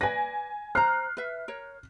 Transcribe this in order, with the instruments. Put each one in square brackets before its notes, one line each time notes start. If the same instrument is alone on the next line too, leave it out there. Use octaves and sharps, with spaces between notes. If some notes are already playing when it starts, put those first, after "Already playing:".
[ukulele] B4 D5 [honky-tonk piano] G#5 A#6
[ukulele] C5 A#5 [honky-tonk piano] F6 F#6 C7
[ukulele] B4 E5
A#4 C#5